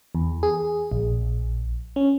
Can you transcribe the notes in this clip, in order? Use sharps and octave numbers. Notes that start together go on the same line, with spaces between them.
E2
G#4
A#1
C#4